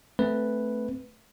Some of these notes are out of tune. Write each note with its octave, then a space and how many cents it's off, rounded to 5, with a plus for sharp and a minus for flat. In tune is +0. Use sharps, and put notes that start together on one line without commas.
A3 +0 C4 -5 B4 +0